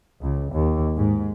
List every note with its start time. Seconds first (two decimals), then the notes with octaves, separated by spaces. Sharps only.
0.20 C#2
0.52 D#2
0.96 G#2